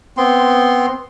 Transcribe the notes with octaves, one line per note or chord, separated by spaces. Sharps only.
B3 C4 C6